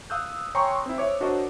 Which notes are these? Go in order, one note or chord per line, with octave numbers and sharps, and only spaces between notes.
F5 D#6 E6 F#6 G6
C#5 G5 G#5 A#5 C6 C#6
C4 E4
C5 C#5 E5 D6
D4 F#4 A#4 C5 C#5 D#5